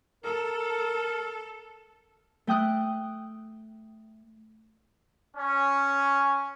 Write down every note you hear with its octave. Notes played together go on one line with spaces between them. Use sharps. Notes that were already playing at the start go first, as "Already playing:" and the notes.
A4 A#4
A3 G5 D#6 F#6
C#4